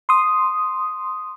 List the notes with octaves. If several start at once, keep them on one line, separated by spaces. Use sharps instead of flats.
C6 D#6